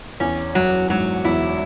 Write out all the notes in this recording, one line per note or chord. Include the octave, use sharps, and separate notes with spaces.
E2 C#4
F#2 F#3
G#2 F#3
E2 E4